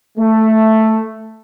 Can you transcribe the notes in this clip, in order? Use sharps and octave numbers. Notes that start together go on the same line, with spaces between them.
A3